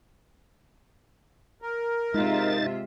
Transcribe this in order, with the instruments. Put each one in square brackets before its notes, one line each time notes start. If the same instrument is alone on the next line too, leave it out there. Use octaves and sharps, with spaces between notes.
[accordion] A#4
[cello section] C3 F4 E5 [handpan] G#3 [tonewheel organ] D#4 A6